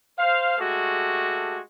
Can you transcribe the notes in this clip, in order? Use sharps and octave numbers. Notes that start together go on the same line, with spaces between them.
C5 F5
G#3 A3 F#4 G4 A4